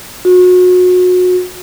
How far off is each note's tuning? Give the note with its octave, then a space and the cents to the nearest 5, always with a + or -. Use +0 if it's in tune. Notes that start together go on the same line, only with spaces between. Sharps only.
F#4 -30